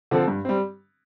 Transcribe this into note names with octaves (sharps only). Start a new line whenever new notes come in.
D3 F3 C4 A4
G2
G3 C4